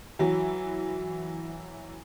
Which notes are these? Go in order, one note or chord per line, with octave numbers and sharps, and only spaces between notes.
E3 F#3